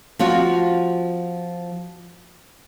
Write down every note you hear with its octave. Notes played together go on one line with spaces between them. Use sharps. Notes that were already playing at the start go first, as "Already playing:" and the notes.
F3 C4 F4 F#4